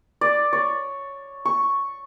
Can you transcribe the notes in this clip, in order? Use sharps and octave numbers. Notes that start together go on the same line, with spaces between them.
D5
C#5
C#6